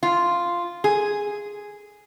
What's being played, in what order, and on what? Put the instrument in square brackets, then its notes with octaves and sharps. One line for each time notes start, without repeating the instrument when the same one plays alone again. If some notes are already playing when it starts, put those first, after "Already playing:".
[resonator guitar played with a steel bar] F4
G#4